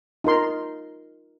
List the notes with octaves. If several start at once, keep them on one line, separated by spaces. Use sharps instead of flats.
D#4 F4 A#4 C6